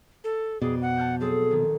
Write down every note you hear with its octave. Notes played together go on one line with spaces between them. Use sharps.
A4
F2 B2 B3 G#4 D5
F#5
A5 F6 G6
F#3 C4 G#4 A4
A#1 D#3